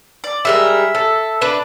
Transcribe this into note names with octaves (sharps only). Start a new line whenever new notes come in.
D5
G3 G#3 A#4 E5
A4
D4 B4 D5